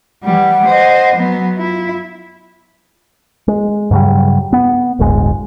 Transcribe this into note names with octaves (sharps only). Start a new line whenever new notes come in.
E3 G3 F#5
C5 D#5
F#3 B3
E4 F4
G#3
G2 C#3 F#3 G3
B3
D1 G1 G#3